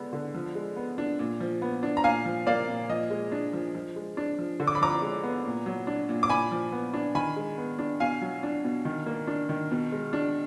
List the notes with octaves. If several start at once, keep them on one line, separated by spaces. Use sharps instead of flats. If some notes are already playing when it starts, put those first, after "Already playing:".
Already playing: D3 G#3 B3
D3
F3
G#3
B3
D4
A#2
F3
B3
D4
A#5
A#2 F5 G#5
F3
A#3 D5 F5
A#2
F3 D#5
G#3
D4
F3
F3
G#3
D4
F3
D3
D6
B5
F3 A#5 D6
G#3
B3
A#2
F#3
D4
A#2
D6
A#2 G#5 B5
F3
B3
D4
D#3 G#5 B5
G#3
B3
D4
B2 F5 G#5
F#3
D4
B2
D#3
A#3
D4
D#3
B2
G#3
D4